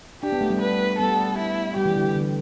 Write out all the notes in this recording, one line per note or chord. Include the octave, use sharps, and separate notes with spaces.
D4 G4
B3
A3
G3 B3
B4
G3 B3 A4
E4
G3 G4
E3
D3
D3